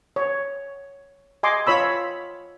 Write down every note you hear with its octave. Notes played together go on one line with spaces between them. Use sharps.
C#5
D#5 G#5 C6 D6
F4 C#5 B5 E6